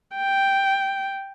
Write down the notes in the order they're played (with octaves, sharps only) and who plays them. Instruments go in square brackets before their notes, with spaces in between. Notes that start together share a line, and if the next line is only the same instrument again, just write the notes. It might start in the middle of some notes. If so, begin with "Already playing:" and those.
[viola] G5